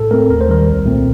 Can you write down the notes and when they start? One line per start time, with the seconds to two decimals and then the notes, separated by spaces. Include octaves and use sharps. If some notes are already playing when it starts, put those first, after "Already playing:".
Already playing: A2 A4
0.11 A3 C4 A#4
0.29 D#2 A#4
0.41 C5
0.49 D#3 G3 A#4
0.67 C2
0.86 A#2 A3 C4